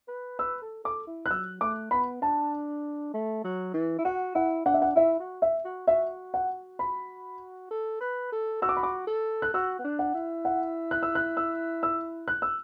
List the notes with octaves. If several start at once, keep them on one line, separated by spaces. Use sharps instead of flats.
B4
B4 E6
A4
A4 D6
E4
F#6
F#3 E6
A3 D6
B3 B5
D4 A5
A3
F#3
E3
E4
F#4 F#5
E4 F#5
D4 F#5
E5
F#5
E4 E5
F#4
E5
F#4
F#4 E5
F#5
B5
A4
B4
A4
F#4 E6
D6
B5
D6
A4
F#6
F#4 E6
B3
D4
F#5
E4
F#5
F#6
E6
F#6
E6
E6
F#6
E6